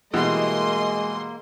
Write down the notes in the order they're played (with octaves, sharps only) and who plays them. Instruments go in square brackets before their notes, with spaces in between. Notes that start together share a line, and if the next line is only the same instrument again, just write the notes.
[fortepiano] B2 E3 G3 [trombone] G#3 [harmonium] A#3 [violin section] D#5 C6